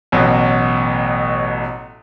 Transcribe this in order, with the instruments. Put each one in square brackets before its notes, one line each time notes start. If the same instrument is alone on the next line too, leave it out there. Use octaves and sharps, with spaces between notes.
[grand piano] A1 B2 F#3